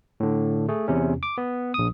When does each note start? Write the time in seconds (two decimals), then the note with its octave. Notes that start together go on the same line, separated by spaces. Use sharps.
0.20 A2 D3
0.68 A3 G#4
0.88 E2 C3 C#4
1.23 D6
1.38 B3
1.74 A#1 D#6